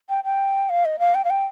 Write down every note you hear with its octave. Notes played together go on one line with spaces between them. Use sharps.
G5
G5
F5
D#5
F5
G5
F5
G5